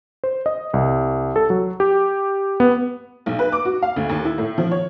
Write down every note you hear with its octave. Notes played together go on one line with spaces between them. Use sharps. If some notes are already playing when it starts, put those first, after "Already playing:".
C5
D#5
C2
A4
F#3
G4
B3
B1
B4
D6
F#4
F5
D2
D#2
E4
A2
F3
C#5